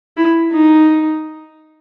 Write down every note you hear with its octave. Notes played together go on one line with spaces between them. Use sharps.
E4
D#4